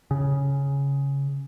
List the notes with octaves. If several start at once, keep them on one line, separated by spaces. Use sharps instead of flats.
C#3